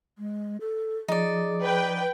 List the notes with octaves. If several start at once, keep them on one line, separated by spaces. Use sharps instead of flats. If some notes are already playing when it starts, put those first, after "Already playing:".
G#3
A4
F3 D#4 G#4 D5
B4 G5